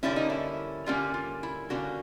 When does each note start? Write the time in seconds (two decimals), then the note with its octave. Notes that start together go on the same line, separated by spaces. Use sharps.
0.03 D3 G3 A#3 C#4 E4
0.16 D#4
0.30 E4
0.86 D3 G3 A#3 C#4 F4
1.14 F4
1.43 E4
1.70 D3 G3 A#3 C#4 F#4